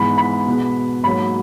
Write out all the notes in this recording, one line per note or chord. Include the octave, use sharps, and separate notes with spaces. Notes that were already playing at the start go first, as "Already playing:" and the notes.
Already playing: G#2 E3 B3 B5
B5
B2 G#3 B3
G#2 F#3 A#3 B5